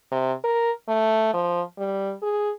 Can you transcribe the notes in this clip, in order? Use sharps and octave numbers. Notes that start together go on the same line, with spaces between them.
C3
A#4
A3
F3
G3
G#4